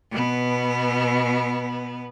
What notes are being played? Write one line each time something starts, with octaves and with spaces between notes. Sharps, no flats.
B2 B3